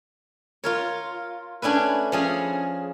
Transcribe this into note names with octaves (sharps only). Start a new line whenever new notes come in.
F4 A#4 C#5
A3 C#4 D4 E4 B4
F3 C#4 G#4